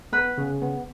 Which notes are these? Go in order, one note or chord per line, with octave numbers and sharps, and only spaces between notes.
B3 B4
C#3
B3